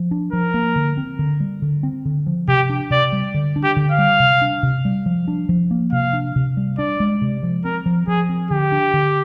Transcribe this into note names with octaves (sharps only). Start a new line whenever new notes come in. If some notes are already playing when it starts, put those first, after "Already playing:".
Already playing: F3
D4
F3 A#4
A#3
D3
C4
D3
G3
D3
C4
D3
F3
C3 G4
D4
C3 D5
G3
D3
D4
G4
D3
F5
G3
C3
D4
C3
G3
F3
D4
F3
A#3
C3 F5
D4
C3
G3
D4 D5
G#3
C3
F3
C4 A#4
F3
F3 G#4
C4
D3 G4
D4
D3